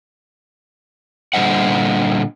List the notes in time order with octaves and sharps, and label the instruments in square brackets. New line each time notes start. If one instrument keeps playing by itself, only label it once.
[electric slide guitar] A#2 D3 G3 C5 D#5 F#5